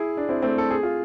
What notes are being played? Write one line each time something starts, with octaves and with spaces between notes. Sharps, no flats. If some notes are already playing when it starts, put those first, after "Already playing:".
Already playing: E4 G#4
D4
C4 E4
A3 C4
A4
G#4
F4